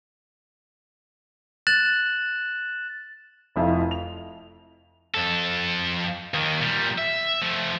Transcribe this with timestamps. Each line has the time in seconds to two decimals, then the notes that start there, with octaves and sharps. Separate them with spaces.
1.67 F#6 A6 E7 F#7
3.56 F1 F2 E4 F4
3.91 F7
5.14 F2 A4
6.34 D#2 D#3
6.62 A#2 G3
6.98 E5
7.42 F3 A3